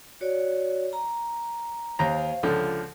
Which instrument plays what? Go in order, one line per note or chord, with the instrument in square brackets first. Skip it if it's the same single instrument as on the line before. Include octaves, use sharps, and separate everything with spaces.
[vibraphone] F#4 C#5 D5
A#5
[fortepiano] D#2 A#5 [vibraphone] C5 F5
[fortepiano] C#2 D3 F3 [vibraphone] A4